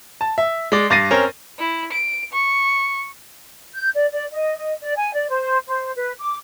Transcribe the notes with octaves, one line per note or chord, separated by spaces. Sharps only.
A5
E5
G#3 D5
G2 D6 A6 A#6 C7 D#7
C4 C#4 A#4 C#5
E4
D7
C#6
G6
D5
D5
D#5
D#5
D5
G#5
D5
C5
C5
B4
D6